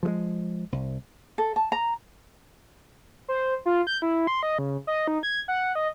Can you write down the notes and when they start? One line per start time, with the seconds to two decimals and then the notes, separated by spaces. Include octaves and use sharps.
0.03 F3 F#3 G#3
0.72 C2
1.38 A4
1.56 A5
1.72 A#5
3.28 C5
3.66 F4
3.87 G6
4.02 E4
4.27 C6
4.43 D#5
4.58 C#3
4.87 D#5
5.07 D#4
5.23 G#6
5.48 F#5
5.75 D#5